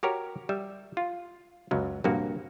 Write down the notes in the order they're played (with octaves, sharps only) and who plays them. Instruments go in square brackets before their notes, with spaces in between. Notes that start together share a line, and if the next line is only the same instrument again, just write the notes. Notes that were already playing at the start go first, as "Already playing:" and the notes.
[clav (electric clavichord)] F#4 G4 A#4 C#5
G3 E5
F4
C#2 F#2 F#3
A#1 G2 C3 A#3 F#4